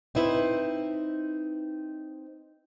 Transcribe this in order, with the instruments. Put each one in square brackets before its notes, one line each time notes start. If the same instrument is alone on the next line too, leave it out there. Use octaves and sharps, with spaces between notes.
[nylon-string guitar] C4 D#4 E4 B4 C5